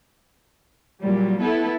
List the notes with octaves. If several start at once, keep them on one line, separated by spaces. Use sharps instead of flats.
A#2 F#3 G3
B3 E4 A4